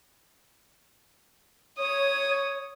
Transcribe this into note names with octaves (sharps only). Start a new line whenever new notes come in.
C#5 D#6